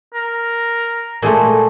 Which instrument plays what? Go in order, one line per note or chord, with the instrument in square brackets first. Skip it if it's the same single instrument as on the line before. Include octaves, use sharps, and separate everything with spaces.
[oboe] A#4
[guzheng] A#2 G#3 A3